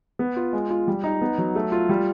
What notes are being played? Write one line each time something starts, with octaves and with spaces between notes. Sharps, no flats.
B3
F4
G#3
F4
G3
D#4
B3
F#3
A3
F4
G3